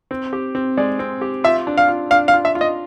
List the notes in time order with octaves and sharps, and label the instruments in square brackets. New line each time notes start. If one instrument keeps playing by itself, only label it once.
[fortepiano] C4
G4
C4
[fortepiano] G#3 [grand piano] D5
[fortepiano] C4
G4
[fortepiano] F4 [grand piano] E5
[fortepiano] D4
[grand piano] F5
[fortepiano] F4
[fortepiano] D4 [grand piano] F5
[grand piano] F5
[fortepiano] F4
[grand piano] E5
[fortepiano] F4
[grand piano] D#5